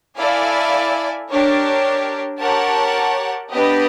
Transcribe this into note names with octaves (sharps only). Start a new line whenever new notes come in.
E4 A4 D5 F5 G#5
D4 G4 A#4 C#5
G4 A#4 C#5 F#5 A5
B3 D4 G4 B4 D#5